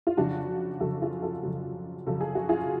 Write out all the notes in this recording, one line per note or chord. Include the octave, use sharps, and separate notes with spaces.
F4
F2 C#3 F#3 D4 F#4
F2 C#3 F#3 F#4 A4
F4 G#4
F#4 A4
F2 C#3 F#3
F2 C#3 F#3 A4
G#4
F#4
F4 G#4